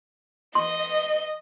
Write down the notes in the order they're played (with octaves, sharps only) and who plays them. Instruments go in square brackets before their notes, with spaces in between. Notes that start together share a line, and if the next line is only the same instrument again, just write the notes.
[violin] D#5 [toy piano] C6